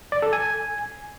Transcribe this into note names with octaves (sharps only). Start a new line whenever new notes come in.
D5
A4
G#5